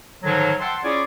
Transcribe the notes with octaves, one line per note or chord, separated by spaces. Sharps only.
G#2 D3 D#3 F3 F#3
E5 F#5 G5 A5 C6
C#4 E4 F4 G#4 C#5 D5